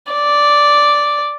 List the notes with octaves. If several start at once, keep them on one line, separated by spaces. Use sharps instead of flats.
D5